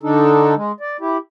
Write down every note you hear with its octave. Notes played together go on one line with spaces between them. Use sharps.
D3 D4 D#4 A4
G#3
D5
E4 G4